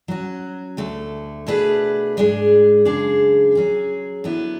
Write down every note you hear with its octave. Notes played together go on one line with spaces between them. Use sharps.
F#3 C#4 F#4
D2 D3 A3
B2 A3 D4 G#4 B4
G#2 G#3 D4 G#4
F#2 C#3 G#3 D4 G#4
F#3 C#4 G#4
D3 F#3 B3 E4